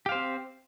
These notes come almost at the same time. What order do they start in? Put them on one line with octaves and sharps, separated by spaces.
G4 F5 C5 C4